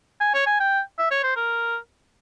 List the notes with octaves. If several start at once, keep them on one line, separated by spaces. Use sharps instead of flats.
G#5
C#5
G#5
G5
E5
C#5
C5
A#4